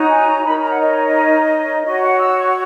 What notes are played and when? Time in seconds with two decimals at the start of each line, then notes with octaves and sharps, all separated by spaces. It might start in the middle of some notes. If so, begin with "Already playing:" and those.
Already playing: D#4 F#4 C#5
0.09 G#5
0.27 A#5
0.45 D#4 A#4 C#5 B5
0.62 A#5
0.71 F#5
0.79 D#5
1.85 F#4 C#5 D#5
2.02 F#5
2.19 E6
2.37 C#6